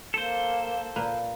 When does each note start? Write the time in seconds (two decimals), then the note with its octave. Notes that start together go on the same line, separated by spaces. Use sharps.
0.14 A#3 A4 C5
0.96 A#2 A#3 B4